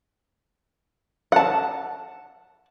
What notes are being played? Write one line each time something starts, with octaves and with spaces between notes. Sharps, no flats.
F#5 A5